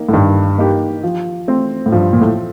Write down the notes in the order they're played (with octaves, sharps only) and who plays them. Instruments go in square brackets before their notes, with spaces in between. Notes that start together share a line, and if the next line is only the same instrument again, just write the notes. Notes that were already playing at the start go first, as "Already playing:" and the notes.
Already playing: [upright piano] D#3 A#3 D#4
[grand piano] A2
[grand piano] G2 [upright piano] D#3
[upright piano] A#3 D#4 G4
F3
A3 C4
[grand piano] A2
[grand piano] G2 [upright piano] F3
[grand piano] A#2
A2